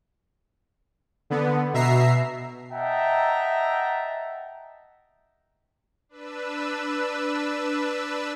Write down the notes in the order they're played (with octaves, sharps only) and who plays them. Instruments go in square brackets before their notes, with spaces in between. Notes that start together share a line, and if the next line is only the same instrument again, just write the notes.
[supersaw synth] D3 B3
B2 E5 A#5 C7
[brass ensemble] D#5 E5 F#5 G5 A5 A#5
[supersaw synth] D4 B4 E6